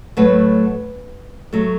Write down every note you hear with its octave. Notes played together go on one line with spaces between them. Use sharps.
A2 F#3 A3 B4
F#3 A3